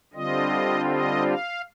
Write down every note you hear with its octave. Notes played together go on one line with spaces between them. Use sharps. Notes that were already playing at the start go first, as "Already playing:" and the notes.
D3 G3 C4 F4 D#5
D#5
F5